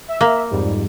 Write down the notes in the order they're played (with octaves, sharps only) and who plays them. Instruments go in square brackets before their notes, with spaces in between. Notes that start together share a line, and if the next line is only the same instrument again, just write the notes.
[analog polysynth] E5
[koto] A#3
[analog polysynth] F2 G#2 G3